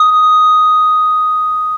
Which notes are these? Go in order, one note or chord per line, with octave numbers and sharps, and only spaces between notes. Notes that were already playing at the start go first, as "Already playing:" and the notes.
Already playing: D#6